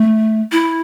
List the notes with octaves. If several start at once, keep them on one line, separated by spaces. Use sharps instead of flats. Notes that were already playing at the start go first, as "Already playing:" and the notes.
Already playing: A3
E4